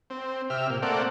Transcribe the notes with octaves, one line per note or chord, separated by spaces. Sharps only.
C4
C3 G4 E5 F6
A#2
A3 A#3 C4 D5 F#5